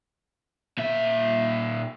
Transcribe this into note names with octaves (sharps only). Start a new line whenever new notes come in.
A#2 E5